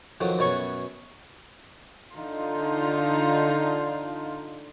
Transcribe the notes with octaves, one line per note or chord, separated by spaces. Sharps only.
F2 D#3 F#3
F#2 B2 C#5 C#6
D3 D#4 F4